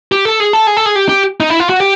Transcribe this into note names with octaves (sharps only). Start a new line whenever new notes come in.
G4
A4
G#4
A4
G#4
A4
G#4
G4
G4
D#4
E4
F4
F#4
G4